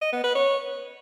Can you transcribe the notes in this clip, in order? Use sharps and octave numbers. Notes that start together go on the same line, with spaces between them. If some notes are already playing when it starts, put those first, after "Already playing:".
D#5
B3
B4
C#5